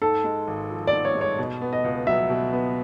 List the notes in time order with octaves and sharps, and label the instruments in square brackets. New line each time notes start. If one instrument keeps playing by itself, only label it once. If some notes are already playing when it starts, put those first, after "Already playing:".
[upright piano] G#2 [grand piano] A4
[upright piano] G#3
G#1
F3
[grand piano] D5
[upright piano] G#2
[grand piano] C#5
[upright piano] G#3
[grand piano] C#5
[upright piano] B2
B3
[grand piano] D#5
[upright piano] C#2
[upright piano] F#3 [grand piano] E5
[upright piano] B2
B3